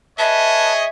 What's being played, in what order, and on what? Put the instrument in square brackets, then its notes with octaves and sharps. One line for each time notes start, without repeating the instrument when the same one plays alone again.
[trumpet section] G#4 C#5 D#5 [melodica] B4 A5 [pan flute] E5